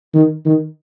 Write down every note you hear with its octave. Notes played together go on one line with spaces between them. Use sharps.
D#3
D#3